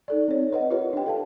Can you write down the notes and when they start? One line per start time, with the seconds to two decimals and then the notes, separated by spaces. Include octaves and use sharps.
0.08 D#4 A4 D5
0.28 C4 C#5
0.52 B4 D#5 F#5
0.70 F4 G4 A#4 B4 C#5 D#5
0.93 D4 G5
1.06 A4 F5 A5